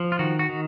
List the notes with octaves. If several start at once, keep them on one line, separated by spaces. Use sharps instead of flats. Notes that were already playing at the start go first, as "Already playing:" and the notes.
Already playing: F3
F4
D#3 F#4
F#4
D#3